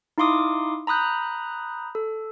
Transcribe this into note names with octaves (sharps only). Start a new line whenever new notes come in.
D#4 E4 F5 C6 D6 D#6
A#5 B5 D#6 F#6 G6
A4